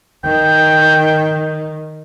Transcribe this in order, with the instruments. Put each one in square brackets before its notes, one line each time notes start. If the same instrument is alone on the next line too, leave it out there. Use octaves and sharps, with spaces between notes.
[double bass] D#3 [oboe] G5